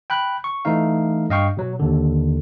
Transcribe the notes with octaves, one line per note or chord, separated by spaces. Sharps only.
G5 B5 F#6
C#6
E3 A3 D#4 F5
G2 D#5 F5 G5 C#6
B2 F#3
D#2 D3